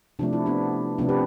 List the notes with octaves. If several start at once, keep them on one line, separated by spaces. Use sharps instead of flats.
C3 F3 A3 D4
E4
B3 D4
C3 F3 A3 B3 D4
G4 B4